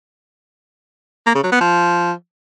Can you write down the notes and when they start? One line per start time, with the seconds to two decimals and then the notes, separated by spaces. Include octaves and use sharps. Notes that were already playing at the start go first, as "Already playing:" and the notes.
1.26 A#3
1.35 C#3
1.43 F#3
1.52 B3
1.61 F3